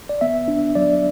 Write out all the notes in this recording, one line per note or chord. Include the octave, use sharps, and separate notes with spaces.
D5
B3 E5
D4
F#3 D5